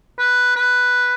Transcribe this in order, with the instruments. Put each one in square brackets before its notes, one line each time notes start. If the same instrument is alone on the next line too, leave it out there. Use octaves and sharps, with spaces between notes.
[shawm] B4
B4